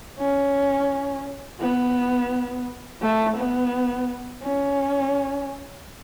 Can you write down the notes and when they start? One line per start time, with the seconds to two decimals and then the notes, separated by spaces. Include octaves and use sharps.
0.20 C#4
1.60 B3
3.02 A3
3.37 B3
4.43 C#4